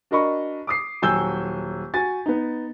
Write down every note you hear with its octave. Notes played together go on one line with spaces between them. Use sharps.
D4 F#4 A#4 D#5 B5 C#6
D6 D#6 C7
D#1 F#3 G#5 E6 G6 G7
F#4 G#5 A6
B3 D#4